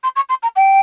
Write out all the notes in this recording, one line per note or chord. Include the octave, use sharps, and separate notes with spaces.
C6
C#6
C6
A#5
G5